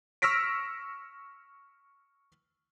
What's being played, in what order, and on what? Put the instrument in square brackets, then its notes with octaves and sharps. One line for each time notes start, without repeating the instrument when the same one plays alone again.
[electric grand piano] C#6 E6 F6 A#6 B6 D7